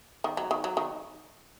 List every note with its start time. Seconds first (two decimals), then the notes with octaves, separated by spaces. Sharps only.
0.24 D#3
0.37 F#3
0.51 D#3
0.64 F#3
0.77 D#3